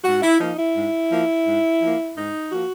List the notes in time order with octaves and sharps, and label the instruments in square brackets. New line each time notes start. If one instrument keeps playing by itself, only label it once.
[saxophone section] G#2 F#4
E4
F3 A#3 D#4
E4
G#2
F3 A#3
G#2
F3 A#3
G#2 D#4
F3 A#3 F#4